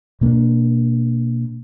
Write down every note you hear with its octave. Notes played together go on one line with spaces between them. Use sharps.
B2 A#3 C#4 D4